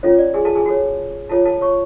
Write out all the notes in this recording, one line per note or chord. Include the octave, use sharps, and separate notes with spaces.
C#4 F4 A4 C#5
D5
G#4 G#5
A4 A5
G#4 G#5
F#4 A4 C#5
F4 A4 C#5 A5
A4 A5
C#5 C#6